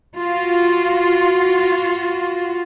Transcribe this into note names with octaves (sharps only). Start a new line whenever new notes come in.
F4 F#4